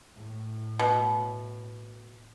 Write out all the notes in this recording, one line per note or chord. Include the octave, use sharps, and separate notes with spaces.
A2
B2